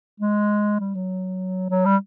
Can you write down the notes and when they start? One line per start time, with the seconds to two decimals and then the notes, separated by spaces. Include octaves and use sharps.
0.20 G#3
0.80 G3
0.95 F#3
1.70 F#3
1.86 G3